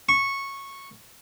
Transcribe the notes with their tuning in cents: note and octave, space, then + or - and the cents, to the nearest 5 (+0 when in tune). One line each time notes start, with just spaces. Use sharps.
C#6 -10